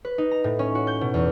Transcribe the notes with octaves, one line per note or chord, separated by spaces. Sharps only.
B4
D#4
A#5
A2
C#4
F#4
G6
B2
E2